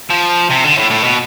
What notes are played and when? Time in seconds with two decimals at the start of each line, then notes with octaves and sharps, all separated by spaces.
0.10 F3
0.50 C3
0.64 D3
0.78 A2
0.90 A2
1.04 B2